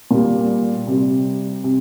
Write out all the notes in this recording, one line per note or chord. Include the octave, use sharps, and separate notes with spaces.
A#2 G3
C3 G3
C3